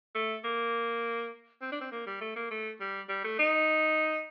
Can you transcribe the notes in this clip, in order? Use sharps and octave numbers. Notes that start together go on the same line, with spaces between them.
A3
A#3
C4
D4
C4
A#3
G3
A3
A#3
A3
G3
G3
A3
D#4